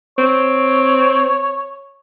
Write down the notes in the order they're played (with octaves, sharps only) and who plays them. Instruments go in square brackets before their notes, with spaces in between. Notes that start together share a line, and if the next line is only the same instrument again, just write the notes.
[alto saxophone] C4 [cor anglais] C#5